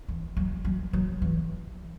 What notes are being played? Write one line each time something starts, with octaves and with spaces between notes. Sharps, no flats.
E3
F#3
F#3
F#3
E3